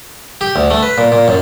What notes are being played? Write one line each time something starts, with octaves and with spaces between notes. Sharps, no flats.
G4
D2
A3
B4
A#2
A#2
F#2